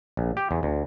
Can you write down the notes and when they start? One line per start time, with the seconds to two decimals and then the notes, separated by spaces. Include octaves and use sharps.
0.17 A#1
0.37 G4
0.51 E2
0.63 D2